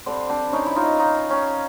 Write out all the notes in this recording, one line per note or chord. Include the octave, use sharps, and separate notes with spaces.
D3 G3 C4 D4
C4 D4
C#4 D#4
E4
D#4 F4
D#4 F4
C#4